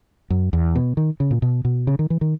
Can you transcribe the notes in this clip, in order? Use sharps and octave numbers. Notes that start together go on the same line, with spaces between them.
F#2
E2
B2
D#3
C#3
A#2
B2
B2
C#3
D#3
E3
D#3